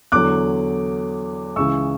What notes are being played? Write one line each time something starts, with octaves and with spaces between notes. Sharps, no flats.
E2 D3 F#3 D6 F#6
C#2 C#3 E3 C#6 E6